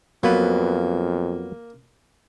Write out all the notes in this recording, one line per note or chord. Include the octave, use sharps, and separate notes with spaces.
F2 F#3 A#3 B3 B4